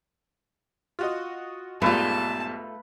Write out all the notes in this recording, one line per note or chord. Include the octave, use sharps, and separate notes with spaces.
F4 F#4 D#5
B1 G#2 G3 A3 F4 B4 F5 A5